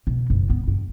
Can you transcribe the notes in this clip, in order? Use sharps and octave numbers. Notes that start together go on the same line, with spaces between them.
B2
F#1
B3
G2